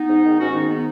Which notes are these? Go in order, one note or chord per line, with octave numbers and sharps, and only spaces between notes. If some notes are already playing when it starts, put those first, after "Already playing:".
Already playing: B3 D#4
G#2
D#3
G#2 C#4 F#4
D#3 B3 D#4
B3 D#4